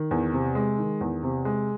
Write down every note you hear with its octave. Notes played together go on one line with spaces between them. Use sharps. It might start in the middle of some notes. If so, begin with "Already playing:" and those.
Already playing: D#3
E2
C3
G#3
D#3
E2
C3
G#3